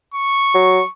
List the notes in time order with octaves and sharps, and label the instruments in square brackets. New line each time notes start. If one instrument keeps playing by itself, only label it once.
[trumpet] C#6
[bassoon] F#3